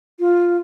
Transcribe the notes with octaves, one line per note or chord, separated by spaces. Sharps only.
F4